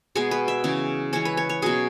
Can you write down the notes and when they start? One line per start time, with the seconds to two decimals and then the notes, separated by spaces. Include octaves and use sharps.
0.16 B2 G#3 B3 G#4
0.31 B4
0.48 E5
0.64 C#3 E3 C#4
1.13 E3 G#3 C#4 C#5
1.25 B4
1.37 C#5
1.49 C#5
1.62 B2 F#3 C#4 G#4